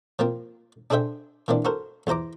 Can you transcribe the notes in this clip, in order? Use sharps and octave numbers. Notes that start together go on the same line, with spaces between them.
F3 A#3 C4
D4 G#4 A4 C5 E5 G5
E3 A#3 C4 D4
F#4 A4 A#4 C5
E2 E3 C5 A#5 D6